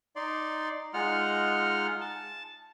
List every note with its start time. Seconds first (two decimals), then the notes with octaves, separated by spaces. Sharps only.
0.16 D#4 D5 C6
0.94 G#3 D#4 F4 F#5 F6
2.01 A5